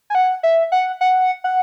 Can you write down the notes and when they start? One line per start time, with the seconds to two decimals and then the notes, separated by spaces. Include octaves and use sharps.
0.10 G#5
0.15 F#5
0.43 E5
0.72 F#5
1.01 F#5
1.44 F#5